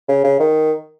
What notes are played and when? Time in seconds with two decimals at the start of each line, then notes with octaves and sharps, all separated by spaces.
0.09 C#3
0.24 C#3
0.40 D#3